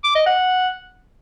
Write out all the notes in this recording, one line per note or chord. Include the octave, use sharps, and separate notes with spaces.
D6
D#5
F#5